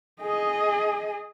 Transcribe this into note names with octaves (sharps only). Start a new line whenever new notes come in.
G#4 D#5